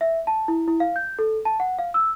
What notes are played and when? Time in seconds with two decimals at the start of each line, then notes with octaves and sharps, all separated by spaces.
0.01 E5
0.27 A5
0.48 E4
0.68 E4
0.80 F5
0.96 G6
1.19 A4
1.45 A5
1.60 F#5
1.79 F5
1.94 E6